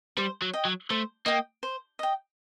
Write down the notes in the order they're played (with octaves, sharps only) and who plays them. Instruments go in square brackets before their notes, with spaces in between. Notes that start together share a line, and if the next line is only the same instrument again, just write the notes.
[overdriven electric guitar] G3 [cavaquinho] C5
[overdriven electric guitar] F#3
[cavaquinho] D#5 G5
[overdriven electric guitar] F#3
[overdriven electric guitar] A3 [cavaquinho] C5
[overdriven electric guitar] A#3 [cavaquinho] D#5 G5
[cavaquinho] C5
D#5 G5